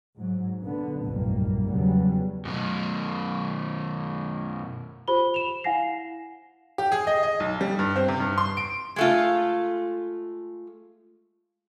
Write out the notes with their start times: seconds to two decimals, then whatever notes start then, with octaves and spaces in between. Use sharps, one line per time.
0.18 G#2 F#3
0.62 D3 B3
1.02 F1 B1 G2 A#2 G3 A#3
1.67 E2 C#3 F#3 G3 B3
2.45 F#2 B2
5.08 F4 G4 C5 B5 G7
5.34 E7 F7
5.64 E4 F5 F#5 G#5 A#6 C7
6.78 G4
6.92 G#4
7.07 D#5
7.23 D#5
7.40 B1
7.61 G3
7.79 G2
7.96 C4
8.08 C3
8.20 G2
8.38 C6
8.57 D7
8.96 G#3 A3 F4